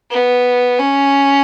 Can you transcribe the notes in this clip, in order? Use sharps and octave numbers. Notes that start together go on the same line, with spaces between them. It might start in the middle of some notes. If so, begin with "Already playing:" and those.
B3
C#4